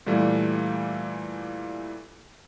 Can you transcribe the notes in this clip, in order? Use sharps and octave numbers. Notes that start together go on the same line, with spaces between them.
A#2 E3 G3 A3